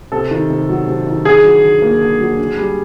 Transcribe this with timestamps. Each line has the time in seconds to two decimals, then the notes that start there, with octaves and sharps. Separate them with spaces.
0.12 C3 A4
0.31 D#3
0.50 C3
0.69 F#3
0.88 C3
1.07 D#3
1.25 D3 G#4
1.44 F#3
1.63 D3
1.82 A#3
2.01 D3
2.20 F#3
2.39 D3
2.57 G3